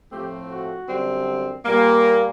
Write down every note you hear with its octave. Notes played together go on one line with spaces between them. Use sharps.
A2 F3 A3 C4 G4
F#4
F#2 D3 G3 C4
A#2 G3 A#3